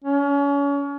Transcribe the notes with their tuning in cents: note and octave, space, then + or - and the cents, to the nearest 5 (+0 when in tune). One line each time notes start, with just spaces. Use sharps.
C#4 +35